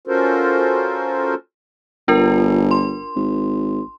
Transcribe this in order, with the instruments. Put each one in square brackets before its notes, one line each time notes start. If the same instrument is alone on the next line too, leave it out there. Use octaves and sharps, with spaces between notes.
[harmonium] C#4 F4 F#4 A4 A#4 C5
[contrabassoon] G1 [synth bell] D4 F4 A#4
[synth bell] C6
[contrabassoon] G#1